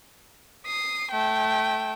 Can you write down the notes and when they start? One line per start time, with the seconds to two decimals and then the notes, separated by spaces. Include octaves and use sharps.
0.66 D#6 C7
1.11 A3 G5